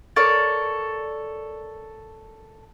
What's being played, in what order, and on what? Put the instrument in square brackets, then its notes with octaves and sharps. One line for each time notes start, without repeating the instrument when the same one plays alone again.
[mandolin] A4 A#4 C#5 D5